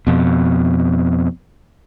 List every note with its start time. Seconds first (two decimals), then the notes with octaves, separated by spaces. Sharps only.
0.07 F2 B2